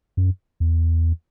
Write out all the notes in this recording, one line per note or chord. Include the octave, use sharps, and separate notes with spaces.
F#2
E2